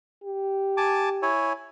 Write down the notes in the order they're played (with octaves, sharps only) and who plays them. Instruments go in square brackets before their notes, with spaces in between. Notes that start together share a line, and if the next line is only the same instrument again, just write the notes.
[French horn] G4
[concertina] G#5 A5 D6
E4 C#5 G#5